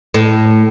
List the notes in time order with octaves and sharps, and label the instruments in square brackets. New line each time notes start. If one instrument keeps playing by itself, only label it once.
[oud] A2